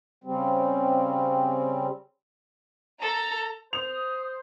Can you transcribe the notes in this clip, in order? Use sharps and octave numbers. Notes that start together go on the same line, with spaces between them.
C#3 G3 C4
A4 A#5
C5 D#6 F7